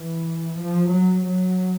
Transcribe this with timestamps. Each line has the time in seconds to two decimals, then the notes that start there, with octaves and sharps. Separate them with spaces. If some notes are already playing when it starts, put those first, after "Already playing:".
Already playing: E3
0.59 F3
0.92 F#3
1.25 F#3